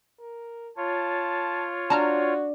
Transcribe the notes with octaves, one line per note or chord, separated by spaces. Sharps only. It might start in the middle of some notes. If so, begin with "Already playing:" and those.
A#4
F4 C#5 A5
D4 F#4 A5 A#5 F6